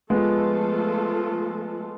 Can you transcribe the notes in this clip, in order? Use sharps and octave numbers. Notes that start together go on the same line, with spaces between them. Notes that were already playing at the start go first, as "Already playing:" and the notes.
F3 G#3 A3 B3 F4 A4